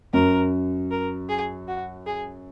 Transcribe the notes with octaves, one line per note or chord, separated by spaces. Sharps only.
F#2 A#4
A#4
G#4
F#4
G#4